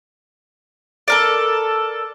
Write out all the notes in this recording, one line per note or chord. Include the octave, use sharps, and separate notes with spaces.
A4 A#4 D5